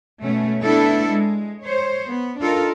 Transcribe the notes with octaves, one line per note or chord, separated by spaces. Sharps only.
B2 A3 C#4
A3 B3 D4 E4 A4
G#3
C5 C#5
B3
D4 D#4 F4 A4 A#4